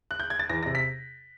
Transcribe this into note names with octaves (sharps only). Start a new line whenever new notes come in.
F#6
G6
G#6
A6
E2 A#6
A#6
C3
B6